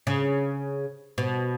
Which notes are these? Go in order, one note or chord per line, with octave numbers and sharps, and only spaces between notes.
C#3
B2